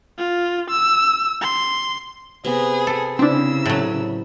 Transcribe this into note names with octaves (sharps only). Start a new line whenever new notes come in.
F4
E6
C6
C3 B3 G#4
A4
C#3 C4 D4 E4 E6
A2 F#3 D5